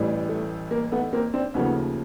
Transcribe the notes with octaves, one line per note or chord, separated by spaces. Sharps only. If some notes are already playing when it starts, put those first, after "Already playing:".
Already playing: A1 A2 E3 G3
A3
A#3
A3 B3
A#3 C4
C4 D4
D#2 C#3 F3 A3 B3 C#4